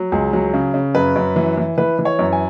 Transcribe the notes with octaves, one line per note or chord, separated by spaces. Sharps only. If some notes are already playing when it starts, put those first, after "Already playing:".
Already playing: F#3
C#2 G#4
F#3
C#3
C#3
F#2 B4
F#2
E3
E3
E3 B4
E3
C#5
F#2
G#5